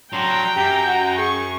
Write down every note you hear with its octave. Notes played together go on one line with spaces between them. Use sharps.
F#3 D4 G5 A#5 C6
F#2 G4
F#4
G#4 C#6